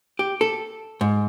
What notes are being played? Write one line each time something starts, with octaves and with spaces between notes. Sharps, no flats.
G4
A4
G#2